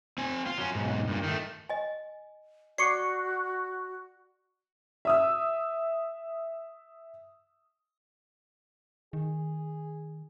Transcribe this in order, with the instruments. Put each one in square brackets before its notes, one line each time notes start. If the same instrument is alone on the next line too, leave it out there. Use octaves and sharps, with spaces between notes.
[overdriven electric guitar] C4 G#5
F4
F#3 C#4
B1 G#2
G2 A#2
D#3 A3
[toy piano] D#5 G#5
[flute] F#4 [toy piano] D5 C#6 D6 [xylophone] C7 C#7
[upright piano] E5 D#6 E6
[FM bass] D#3 [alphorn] G#4